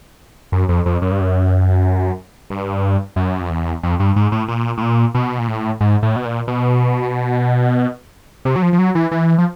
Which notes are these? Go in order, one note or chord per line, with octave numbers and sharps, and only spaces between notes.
F#2
F2
F2
F#2
G2
F#2
G2
F#2
F2
E2
F2
G2
G#2
A2
A#2
A2
A#2
B2
A#2
A2
G#2
A2
B2
A#2
B2
C3
F#3
F3
F3
F#3
E3
E3
F3